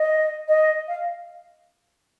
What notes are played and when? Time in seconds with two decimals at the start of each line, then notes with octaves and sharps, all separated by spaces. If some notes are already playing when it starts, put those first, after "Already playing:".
Already playing: D#5
0.48 D#5
0.88 F5